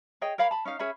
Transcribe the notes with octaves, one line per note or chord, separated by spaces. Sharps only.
G#4 C#5 D#5 G5
A#4 C#5 F5 B5
A5 B5
C#4 D#4 F5
C#4 G#4 E5 B5